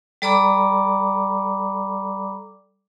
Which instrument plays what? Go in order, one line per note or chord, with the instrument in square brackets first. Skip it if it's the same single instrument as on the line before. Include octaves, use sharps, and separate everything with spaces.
[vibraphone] G3 A4 D5 A#5 B5 D6